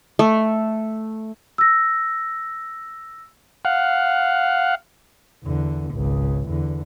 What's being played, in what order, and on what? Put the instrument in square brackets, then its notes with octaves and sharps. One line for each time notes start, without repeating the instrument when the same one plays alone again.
[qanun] A3
[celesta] E6 A#6
[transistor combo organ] F5 F#5
[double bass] E2 D3
G#1 C#2
E2 D3